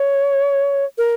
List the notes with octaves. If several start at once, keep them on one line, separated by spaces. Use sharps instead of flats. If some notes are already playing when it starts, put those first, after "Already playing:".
Already playing: C#5
A#4